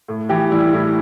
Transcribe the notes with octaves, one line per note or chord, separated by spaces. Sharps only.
A2
E3 G4
G3 E4
A2 E4